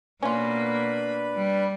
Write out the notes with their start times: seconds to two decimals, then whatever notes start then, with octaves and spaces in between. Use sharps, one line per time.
0.23 B2 A#3 C#4 D4 F4 B4 B5
1.35 G3